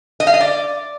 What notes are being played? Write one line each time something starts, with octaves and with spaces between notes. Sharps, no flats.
D#5
F5
D#5
D5